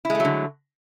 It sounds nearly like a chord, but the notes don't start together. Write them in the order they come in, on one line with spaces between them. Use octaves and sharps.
E4 G#3 A3 F#3 D3